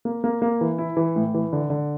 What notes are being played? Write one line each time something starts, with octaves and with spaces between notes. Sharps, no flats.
A#3
A#3
A#3
E3
E4
E3
A2
E3
D3
D3